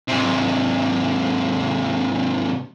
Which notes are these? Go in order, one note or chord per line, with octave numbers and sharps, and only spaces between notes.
G#2 C3